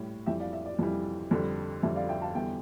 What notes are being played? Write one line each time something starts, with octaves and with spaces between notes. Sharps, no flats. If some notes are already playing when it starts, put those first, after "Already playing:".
Already playing: A2 G3
F2 E3 G3 E5 G5
D5 F5
E5
D5
F2 E3 G3
F2 D3 G3
F2 D3 G3 E5
D5 F5
E5 G5
F5 A5
E2 D3 G3 E5 G5